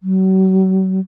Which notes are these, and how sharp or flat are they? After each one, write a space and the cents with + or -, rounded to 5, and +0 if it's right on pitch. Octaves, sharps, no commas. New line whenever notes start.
F#3 +40